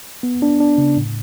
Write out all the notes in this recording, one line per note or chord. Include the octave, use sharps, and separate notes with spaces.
B3
D4
D4
C#3
A2